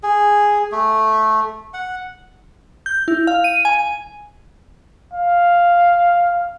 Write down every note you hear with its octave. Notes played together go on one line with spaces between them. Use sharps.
G#4
A3
F#5
G6
E4
F5
D#7
G#5
F5